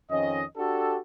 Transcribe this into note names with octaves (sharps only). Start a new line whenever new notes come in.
F2 D#3 C#4 D#5
D4 F#4 G4 A4